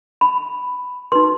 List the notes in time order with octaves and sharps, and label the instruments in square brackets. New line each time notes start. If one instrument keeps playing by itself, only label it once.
[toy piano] B5
D#4 F#4 B4 C6